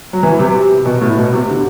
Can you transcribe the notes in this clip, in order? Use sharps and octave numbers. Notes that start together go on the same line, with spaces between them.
F#3
E3
C3
B2
A2
B2
C3
D3